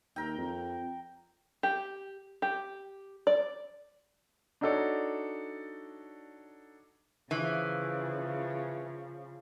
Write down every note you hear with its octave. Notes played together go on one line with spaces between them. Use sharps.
D#2 A#4 G5
F2
G4
G4
D5
D4 D#4 F#4 A4 C#5 D5
C#3 E3 F3